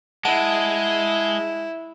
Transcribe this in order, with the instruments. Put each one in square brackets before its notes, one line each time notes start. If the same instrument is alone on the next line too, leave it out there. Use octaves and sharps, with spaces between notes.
[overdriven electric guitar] G#3 [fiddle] E4 [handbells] F#5 A5 D7